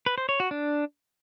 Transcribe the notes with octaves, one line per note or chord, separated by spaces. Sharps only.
B4
C5
C#5
F#4
D4